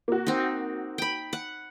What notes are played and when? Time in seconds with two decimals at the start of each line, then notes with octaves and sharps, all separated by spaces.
0.08 A#3 F#4
0.27 C4 D#4
0.98 G5 B5
1.33 F#5